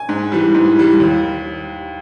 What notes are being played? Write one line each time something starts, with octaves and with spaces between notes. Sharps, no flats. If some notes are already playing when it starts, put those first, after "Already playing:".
Already playing: G#5
G#2
E3 G3
G#2
E3 G3
D#2